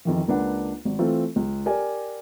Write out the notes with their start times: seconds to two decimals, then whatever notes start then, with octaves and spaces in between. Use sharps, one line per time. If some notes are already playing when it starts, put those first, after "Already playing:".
0.05 F2 D#3 E3
0.28 C#2 A#3 D4 B4 F#5
0.85 G#1
0.99 E3 A3 C4 F4
1.36 C#2
1.66 G4 A#4 D5 G#5